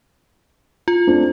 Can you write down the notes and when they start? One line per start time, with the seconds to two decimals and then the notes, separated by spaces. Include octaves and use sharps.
0.88 F4
1.07 A3 C4 D4